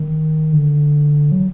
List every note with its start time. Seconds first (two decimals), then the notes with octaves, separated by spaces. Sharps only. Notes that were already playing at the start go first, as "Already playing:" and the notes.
Already playing: D#3
0.52 D3
1.32 F#3